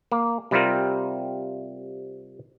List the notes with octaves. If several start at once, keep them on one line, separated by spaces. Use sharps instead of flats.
A#3
C3 G3 C4 F4 A#4